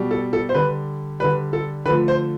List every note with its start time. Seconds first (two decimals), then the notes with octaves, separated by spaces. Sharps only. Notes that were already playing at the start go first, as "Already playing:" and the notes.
Already playing: B2 G3
0.11 A4
0.33 A4
0.49 C5
0.54 D3 G3 B4
1.20 D3 G3 B4
1.53 A4
1.86 D3 F3 A3 B4
2.08 C5